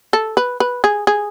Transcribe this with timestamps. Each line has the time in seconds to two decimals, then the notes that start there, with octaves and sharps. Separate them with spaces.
0.13 A4
0.37 B4
0.60 B4
0.84 G#4
1.07 G#4